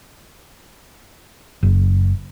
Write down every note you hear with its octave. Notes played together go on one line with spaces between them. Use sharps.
F#1